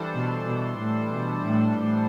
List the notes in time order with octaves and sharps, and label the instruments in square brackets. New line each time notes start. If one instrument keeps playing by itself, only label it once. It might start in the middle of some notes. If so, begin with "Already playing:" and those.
Already playing: [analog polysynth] E3 G3 D4 A4 C5
[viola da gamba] B2
B2
A2
B2
A2
A2